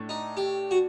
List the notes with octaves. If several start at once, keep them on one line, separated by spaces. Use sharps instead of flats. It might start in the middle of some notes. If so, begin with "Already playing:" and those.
Already playing: A2 A3 D4
D#4
G4
F#4